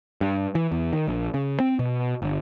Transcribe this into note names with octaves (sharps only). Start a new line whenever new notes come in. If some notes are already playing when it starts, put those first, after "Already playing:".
G2
E3
E2
D#3
A#1
C#3
C4
B2
G1